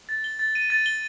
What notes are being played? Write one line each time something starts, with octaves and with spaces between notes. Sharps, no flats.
A6
G7
A6
D#7
A6
G7